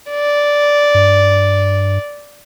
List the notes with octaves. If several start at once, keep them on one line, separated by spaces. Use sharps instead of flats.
D5
G2